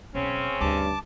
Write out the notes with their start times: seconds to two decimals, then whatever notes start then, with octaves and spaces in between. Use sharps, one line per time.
0.15 B1 C#3 C4 C#4
0.61 D2 G2 A5 D6